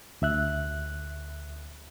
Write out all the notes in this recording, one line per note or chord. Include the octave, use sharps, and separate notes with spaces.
D2 E5 F#6